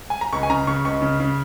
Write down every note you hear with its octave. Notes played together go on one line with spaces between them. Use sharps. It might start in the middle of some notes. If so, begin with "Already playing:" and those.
G#5
A#5
C#2 C#6
G#5
C#3 A#5
C#3 C#6
C#2 C#6
C#3
C#3